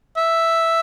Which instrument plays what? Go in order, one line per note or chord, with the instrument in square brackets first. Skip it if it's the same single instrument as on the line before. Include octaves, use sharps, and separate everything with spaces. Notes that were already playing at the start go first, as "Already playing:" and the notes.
[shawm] E5